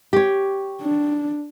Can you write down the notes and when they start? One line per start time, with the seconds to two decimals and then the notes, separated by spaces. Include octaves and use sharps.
0.13 G4 C#5
0.82 D4